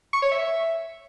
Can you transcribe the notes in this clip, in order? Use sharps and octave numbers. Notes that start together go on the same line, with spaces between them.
C#6
C#5
E5